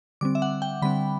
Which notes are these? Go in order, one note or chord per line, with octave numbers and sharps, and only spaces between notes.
D3 G3 C4 D6
E5
F#5
G5
D3 G3 C4 B5